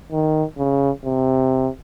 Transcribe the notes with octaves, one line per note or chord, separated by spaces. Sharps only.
D#3
C#3
C3